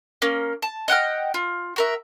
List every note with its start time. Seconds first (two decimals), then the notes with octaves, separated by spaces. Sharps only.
0.22 A#3 C#4
0.62 A5
0.88 D#5 F#5 G5 F6
1.34 F4
1.76 F#4 A#4 E5